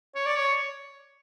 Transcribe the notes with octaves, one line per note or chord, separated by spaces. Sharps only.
C#5
D5
C#5